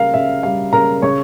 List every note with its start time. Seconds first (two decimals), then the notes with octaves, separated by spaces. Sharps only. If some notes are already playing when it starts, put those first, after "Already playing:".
Already playing: C#3 G3 A#4 F5
0.14 C#3 E5
0.43 G3 F5
0.73 C#3 A#4 A#5
1.02 C#3 C#5 C#6